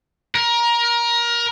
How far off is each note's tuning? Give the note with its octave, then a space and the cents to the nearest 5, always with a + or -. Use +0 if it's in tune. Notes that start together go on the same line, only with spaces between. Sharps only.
A#4 +20